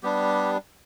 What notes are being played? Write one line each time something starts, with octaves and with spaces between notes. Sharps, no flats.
G3 B3 D4 G4